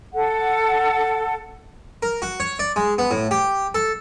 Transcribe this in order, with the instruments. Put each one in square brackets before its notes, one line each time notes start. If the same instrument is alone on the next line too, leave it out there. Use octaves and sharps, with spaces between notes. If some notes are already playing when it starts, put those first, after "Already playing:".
[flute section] A4 F#5
[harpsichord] A#4
F#4
C#5
D5
G#3
B3
A2
G4
A4